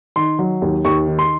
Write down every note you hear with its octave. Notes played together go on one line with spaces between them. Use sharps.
D#3 C6
F#3
D#2
D#2 C#6
D#3
C6